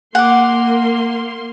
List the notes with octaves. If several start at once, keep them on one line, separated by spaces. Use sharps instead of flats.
A#3 F#5 C6 D6